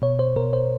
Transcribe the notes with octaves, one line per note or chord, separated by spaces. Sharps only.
B2 C#5
C5
B2 A#4
C5